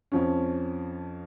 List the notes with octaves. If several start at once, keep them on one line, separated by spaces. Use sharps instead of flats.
F2 F3 C#4